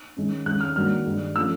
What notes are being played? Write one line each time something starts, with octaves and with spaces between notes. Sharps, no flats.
D#3 G#3 C#4
D#3 G#3 C#4 F#6
F6
D#3 F#3 A#3 D4 F6
G2 D#3 G#3
F3 A3 C#4 E6